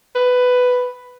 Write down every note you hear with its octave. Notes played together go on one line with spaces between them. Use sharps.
B4